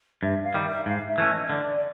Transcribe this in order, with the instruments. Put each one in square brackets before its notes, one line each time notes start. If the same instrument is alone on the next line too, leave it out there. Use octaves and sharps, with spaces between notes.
[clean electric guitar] G2 [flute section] E5
[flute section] F5
[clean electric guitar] D#3 G3
[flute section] E5
[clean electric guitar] G#2 [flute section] F5
[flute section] E5
[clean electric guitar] E3 A3 C#4
[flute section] D#5
D#5
[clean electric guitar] D3 [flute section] D5
[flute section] D5